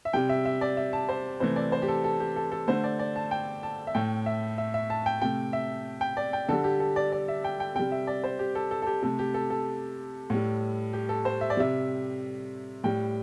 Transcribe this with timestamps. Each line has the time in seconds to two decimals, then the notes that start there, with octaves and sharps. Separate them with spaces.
0.05 E5
0.13 C3 G3 G5
0.29 E5
0.45 E5
0.61 D5
0.77 E5
0.93 A5
1.09 C5
1.40 C3 E3 A3 C5
1.56 D5
1.72 C5
1.82 G4
1.88 A4
2.04 A4
2.20 G4
2.36 A4
2.52 A4
2.68 D3 A3 C5
2.84 D5
2.99 D5
3.16 A5
3.31 G5
3.63 A5
3.87 E5
3.95 A2 A3 G5
4.26 E5
4.58 E5
4.74 E5
4.90 A5
5.06 G5
5.22 C3 A3 G5
5.53 E5
6.01 G5
6.17 D5
6.33 G5
6.49 D3 G3 A4
6.64 G4
6.80 A4
6.96 D5
7.12 D5
7.28 E5
7.44 G5
7.60 G5
7.76 C3 G3 G5
7.92 E5
8.07 D5
8.24 C5
8.39 G4
8.55 A4
8.71 A4
8.82 A4
8.87 G4
9.03 C3 A3 A4
9.19 G4
9.34 A4
9.50 A4
10.30 A2 G3
10.93 G4
11.09 A4
11.25 C5
11.41 E5
11.50 D5
11.57 C3 G3 E5
12.84 A2 G3 G5